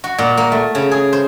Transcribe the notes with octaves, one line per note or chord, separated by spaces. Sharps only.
F#4
A#2
A#3
A3
C#3
G#4
C5